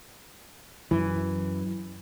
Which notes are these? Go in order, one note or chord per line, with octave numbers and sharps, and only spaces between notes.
F#2 E3